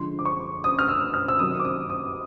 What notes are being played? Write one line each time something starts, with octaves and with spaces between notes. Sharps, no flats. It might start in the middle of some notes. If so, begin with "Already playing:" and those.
Already playing: D3 F3 G#3 C6
D6
C#6
D#6
F6
E6
F6
E6
C3 D#3 F#3 D#6
D6
D#6
D#6